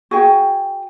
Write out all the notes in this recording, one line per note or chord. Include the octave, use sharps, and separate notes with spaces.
F#4 G#4 G5